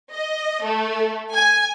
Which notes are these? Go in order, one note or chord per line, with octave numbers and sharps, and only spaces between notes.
D#5
A3
G#5